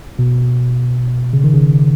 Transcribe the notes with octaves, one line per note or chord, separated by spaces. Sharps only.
B2
C#3
D#3
C#3